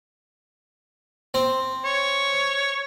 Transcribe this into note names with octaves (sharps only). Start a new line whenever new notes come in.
C4
C#5